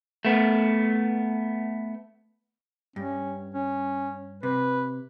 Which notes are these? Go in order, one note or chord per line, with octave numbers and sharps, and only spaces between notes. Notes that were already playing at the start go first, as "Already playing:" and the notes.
A3 B3
G2 C#4
C#4
C3 B4